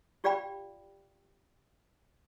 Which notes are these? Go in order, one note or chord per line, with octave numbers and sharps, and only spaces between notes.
F4 G4 D5 F5 G5 B5